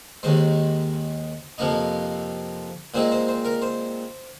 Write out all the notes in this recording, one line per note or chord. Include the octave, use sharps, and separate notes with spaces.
D#2 D#3 G#3 C5
F2 C3 F3 A#3 D#4
A#2 G#3 C4 D#4 C5
C5
C5
A#4
C5